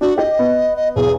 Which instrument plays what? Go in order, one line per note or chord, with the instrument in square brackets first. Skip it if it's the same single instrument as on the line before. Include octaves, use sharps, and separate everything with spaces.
[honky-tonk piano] D4 [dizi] F#4
[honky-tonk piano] G4 [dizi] D#5
[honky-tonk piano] B3
[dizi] D#5
[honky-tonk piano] B1 E2 [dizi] G#4